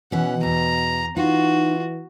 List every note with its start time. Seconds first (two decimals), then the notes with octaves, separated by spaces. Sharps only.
0.12 B2 E3 C#4 F#5
0.43 E2 A#5
1.17 E3 D#4 F4 F#4